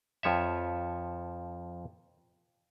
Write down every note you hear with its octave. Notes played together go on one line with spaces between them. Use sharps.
F2 F3 C#5 E5